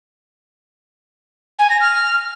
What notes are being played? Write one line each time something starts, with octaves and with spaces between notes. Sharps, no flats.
G#5
A#6
F6